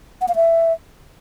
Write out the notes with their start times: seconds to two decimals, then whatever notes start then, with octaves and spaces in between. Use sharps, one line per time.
0.21 F#5
0.28 F5
0.36 E5